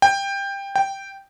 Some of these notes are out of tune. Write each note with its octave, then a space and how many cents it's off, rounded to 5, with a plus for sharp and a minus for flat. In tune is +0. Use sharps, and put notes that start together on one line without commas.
G5 +15
G5 -5